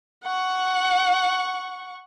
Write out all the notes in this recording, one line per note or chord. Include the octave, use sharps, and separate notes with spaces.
F#5 C#6